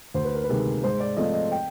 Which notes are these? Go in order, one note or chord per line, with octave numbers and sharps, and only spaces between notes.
D2 C5
B4
A#4
B4
C3 D#3 G#3
G#2 C5
D5
F3 A3 C4 D#5
D#5
G5